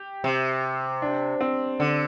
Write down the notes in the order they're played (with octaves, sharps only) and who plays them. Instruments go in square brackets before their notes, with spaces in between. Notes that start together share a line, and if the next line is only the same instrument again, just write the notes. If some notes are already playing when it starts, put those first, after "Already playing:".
Already playing: [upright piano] G4
[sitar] C3
[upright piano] D4
C4
[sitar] D3